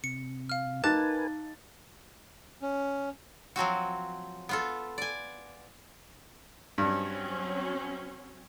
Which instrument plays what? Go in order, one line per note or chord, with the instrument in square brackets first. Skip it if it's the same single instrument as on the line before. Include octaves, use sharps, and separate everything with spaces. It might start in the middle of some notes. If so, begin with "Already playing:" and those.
[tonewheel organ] C3 [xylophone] C#7
[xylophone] F5 F6
[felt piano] D#4 A6 [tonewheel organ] A#4 B4 G#5 [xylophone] A5 D6 F#6
[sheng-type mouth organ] C#4
[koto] F3 F#3 C4 F#4
B3 F4 A4
D5 G#5
[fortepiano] G2 [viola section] F#3 C4 C#4